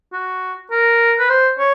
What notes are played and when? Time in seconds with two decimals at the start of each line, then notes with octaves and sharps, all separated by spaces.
0.13 F#4
0.71 A#4
1.19 B4
1.30 C5
1.59 C#5